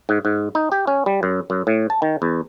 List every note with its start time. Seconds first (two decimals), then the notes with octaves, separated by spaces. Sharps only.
0.09 G#2
0.25 G#2
0.55 D#4
0.72 G4
0.87 C#4
1.06 G3
1.23 F#2
1.50 F#2
1.67 A2
1.90 A5
2.02 D#3
2.22 E2